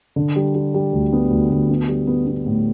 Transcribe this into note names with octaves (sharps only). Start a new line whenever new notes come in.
D3
G3
G3
G3
D2
B3
D2
D2
B3
G3
B3
B3
A2